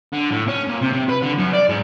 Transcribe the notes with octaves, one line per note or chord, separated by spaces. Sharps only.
D3
A2
C#4
A#2
C3
C3
B4
D3
F#2
D5
G#2